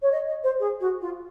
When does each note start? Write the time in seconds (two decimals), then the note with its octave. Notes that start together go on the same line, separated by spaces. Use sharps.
0.02 C#5
0.11 D#5
0.27 D#5
0.43 C5
0.59 G#4
0.80 F#4
1.01 F4